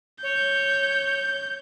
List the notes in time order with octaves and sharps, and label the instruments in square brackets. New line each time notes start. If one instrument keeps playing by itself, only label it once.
[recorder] C#5 [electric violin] G6